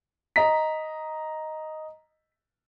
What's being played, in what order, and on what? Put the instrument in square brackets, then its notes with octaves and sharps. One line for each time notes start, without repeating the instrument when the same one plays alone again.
[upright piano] D#5 A#5 B6